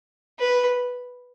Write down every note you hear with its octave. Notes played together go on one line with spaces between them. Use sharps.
B4